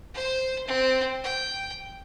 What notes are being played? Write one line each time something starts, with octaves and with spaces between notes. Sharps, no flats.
C5
C4
G5